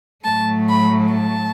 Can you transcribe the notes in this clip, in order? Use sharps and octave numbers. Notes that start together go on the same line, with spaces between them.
A2 F#3 A3 A5
B5
A5